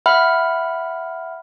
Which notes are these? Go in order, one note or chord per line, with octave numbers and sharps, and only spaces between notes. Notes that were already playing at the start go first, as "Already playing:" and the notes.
E5 F#5 B5 F6